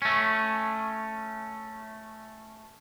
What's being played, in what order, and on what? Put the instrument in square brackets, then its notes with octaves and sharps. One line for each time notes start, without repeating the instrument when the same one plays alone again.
[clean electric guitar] A3 C#4